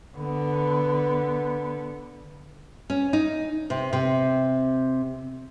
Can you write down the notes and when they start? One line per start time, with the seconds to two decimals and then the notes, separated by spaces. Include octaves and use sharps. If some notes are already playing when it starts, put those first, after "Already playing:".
0.16 D3 B3
2.90 C#4
3.13 D#4
3.70 C3
3.93 C3